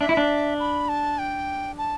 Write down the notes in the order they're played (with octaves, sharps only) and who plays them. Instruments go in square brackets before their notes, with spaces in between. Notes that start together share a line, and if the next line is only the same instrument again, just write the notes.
[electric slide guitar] D4 [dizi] E5
[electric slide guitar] E4
D4
[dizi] B5
A5
G5
A5